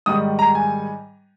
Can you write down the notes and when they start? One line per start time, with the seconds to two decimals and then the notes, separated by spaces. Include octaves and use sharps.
0.06 G#2 D#3 G3 D#6
0.39 A#5
0.55 G#5